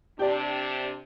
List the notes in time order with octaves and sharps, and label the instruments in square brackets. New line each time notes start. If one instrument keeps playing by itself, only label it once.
[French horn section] C3 D4 [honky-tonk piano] G4 D5